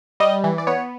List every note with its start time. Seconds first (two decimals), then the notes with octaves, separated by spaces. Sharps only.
0.20 G3 D#5
0.44 E3
0.58 D5
0.67 B3 C#5